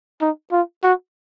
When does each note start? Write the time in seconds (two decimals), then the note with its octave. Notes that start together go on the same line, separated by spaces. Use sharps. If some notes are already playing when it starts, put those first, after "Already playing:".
0.21 D#4
0.52 F4
0.83 F#4